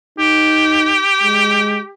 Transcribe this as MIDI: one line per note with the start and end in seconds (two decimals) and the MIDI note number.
0.19 1.01 63
0.19 1.92 67
1.23 1.80 56